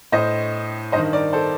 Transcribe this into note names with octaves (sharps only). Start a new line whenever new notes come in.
A2 C5 D#5
G2 D#3 C5 D#5
A#4 D5
A4 C5